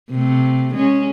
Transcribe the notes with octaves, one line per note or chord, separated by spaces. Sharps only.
C3 A3
G#3 C#4